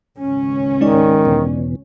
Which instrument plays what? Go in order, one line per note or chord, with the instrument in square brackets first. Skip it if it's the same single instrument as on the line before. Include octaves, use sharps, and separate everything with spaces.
[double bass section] G#1 C#2 C#4
[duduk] D#3 [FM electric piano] G#3 D#4 D5
[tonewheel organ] E2 B2